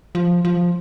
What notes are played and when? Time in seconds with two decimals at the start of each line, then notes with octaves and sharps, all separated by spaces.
0.15 F3
0.45 F3